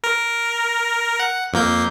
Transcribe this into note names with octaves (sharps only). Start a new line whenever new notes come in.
A#4
F#5
F2 A#3 G6